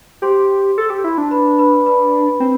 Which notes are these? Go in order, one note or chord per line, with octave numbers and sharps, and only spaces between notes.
G4 C5 C6
A4
G4
E4
D4 A5
B4 B5
B4 B5
B4 B5
C4